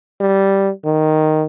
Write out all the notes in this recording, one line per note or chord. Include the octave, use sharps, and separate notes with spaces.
G3
D#3